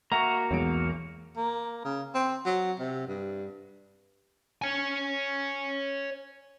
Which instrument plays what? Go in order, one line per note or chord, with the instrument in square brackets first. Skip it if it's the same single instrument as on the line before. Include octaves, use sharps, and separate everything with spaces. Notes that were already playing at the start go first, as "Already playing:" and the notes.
[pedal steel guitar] A#3 F#4 [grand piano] E5 F#5 [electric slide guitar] A#5
[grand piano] B1 G#3 D7 [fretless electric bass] E2
[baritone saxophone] A#3
C#3
C4
F#3
C3
G2
[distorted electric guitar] C#5 G#5